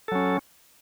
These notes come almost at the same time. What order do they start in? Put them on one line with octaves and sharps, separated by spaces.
A4 F#3 C#4